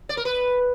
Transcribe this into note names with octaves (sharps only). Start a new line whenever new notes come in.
D5
A#4
B4